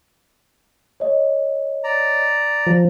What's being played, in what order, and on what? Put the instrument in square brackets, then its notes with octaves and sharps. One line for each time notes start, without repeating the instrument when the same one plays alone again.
[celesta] C#5 D#5
[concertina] D5 A#5
[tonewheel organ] F3